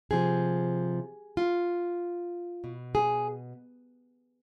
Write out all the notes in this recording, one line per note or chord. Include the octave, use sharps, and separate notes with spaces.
C3 F3 G#4
F4
B2
G#4